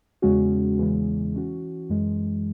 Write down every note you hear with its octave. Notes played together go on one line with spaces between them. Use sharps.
E2 C#3 G#3 C#4 F#4
E2 C#3 E3 G#3
E3 C#4 F#4
F#2 E3 G#3